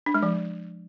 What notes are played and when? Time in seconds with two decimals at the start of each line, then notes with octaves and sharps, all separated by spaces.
0.06 D4
0.14 G#3
0.23 F3